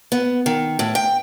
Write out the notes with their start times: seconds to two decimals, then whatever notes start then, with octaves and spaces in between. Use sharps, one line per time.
0.12 B3
0.46 D#3
0.79 A2
0.95 G5